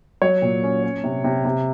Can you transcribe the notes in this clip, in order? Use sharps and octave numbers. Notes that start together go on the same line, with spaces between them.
F#3 C#5
A#2
C#4
C#4
C3
C3
C3